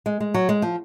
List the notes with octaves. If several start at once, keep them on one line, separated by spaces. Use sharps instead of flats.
G#3
G#3
F#3
G#3
F3